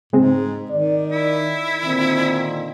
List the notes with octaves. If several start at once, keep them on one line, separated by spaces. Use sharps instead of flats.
G#2 C#3 G#3 C4
D#3 D5
E4
A#2 D3 D#3 C4